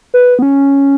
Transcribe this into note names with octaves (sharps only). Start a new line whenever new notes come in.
B4
B3
C#4